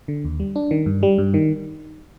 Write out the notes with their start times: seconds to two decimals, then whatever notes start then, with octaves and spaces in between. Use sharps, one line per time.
0.08 D3
0.25 D#2
0.40 G3
0.56 D4
0.71 D#3
0.86 G2
1.03 G3
1.18 G2
1.34 D#3